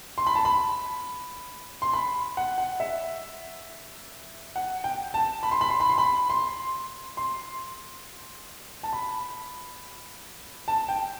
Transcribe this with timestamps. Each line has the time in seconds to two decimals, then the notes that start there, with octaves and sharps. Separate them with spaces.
0.18 C6
0.27 B5
0.35 A5
0.45 B5
1.82 C6
1.93 B5
2.37 F#5
2.58 F#5
2.80 E5
4.56 F#5
4.84 G5
5.14 A5
5.43 B5
5.52 C6
5.61 B5
5.70 C6
5.80 B5
5.90 C6
5.98 B5
6.30 C6
7.17 C6
8.83 A5
8.93 B5
10.68 A5
10.89 G5